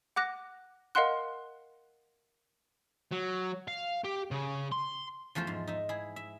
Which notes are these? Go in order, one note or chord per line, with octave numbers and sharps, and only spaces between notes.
F#5 D6 F#6 A#6
A#4 D#5 F5 F#5 C6 F#6
F#3
F5
G4
C#3
C6
E2 F3 A3 F4 C5
G#2
D#4 E5
E4 G#4
E5